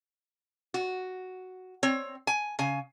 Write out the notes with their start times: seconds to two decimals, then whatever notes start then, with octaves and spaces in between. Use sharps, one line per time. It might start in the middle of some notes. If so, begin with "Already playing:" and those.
0.74 F#4
1.83 C4 C#5
2.27 G#5
2.59 C#3 G#5